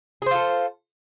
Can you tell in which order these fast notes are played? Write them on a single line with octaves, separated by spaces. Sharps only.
G#4 C5 F4 A4